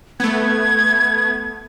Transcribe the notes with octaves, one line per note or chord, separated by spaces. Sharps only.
A3 B3 G#6